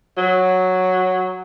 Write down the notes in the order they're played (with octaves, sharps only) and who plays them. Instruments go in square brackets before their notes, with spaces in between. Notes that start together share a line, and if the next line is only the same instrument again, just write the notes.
[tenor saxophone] F#3